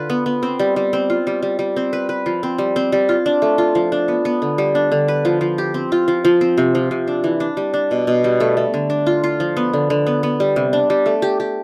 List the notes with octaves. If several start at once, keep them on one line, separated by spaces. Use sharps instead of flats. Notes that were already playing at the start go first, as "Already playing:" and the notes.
Already playing: D3 F4 B4
B3
B3
C4
G3
G3
C4
F4
G3
G3
G3
C4
B4
B4
F3
C4
G3
C4
G3
F4
D4
A3
F4
F3
D4
B3
B3
D3
G3
D4
D3
B4
F3
F3
G4
C4
F4
F3
F3
C4
C3
F3
C3
D4
E3
D4
G3
D4
B2
B2
G3
A3
A3
D3
D4
F4
F4
F3
B3
D3
D3
B3
B3
G3
C3
D4
G3
A3
G4
G4